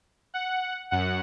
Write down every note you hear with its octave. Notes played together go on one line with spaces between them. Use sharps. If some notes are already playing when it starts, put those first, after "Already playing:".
F#5
F#2 F#5